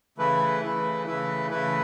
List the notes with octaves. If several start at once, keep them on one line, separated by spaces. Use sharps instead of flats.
C#3 E3 A3 E4 B4
C#3 E3 A3 E4 B4
C#3 E3 A3 E4 B4
C#3 E3 A3 E4 B4